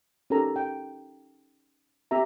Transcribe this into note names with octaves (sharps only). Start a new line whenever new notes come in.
C#4 D#4 G4 A4 A#4 A#5
G5
C4 G4 E5 A#5